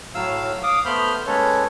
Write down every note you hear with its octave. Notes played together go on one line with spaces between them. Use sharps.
A2 F#3 F5 E6
F5 D6 D#6
A3 B3 C5 B5 F6 G6
G#3 A#3 C#4 A4 B4 C#5